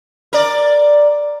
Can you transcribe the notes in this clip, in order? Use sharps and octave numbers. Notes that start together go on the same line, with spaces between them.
A#4 D5